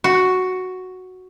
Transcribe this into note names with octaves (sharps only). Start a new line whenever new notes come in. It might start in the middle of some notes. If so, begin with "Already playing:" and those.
F#4